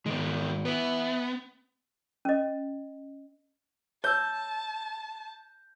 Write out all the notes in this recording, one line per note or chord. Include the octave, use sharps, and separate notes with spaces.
G#2 D#3 G#3 B3
B3 B4 E5
C#4 D#5
C#5 A5 E6 G6